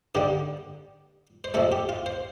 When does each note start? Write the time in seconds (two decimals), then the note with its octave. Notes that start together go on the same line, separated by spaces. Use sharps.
0.15 G2 D3 G3 G4
1.44 C5
1.54 F2 C3 A3 A4
1.72 G4
1.89 F4
2.06 C5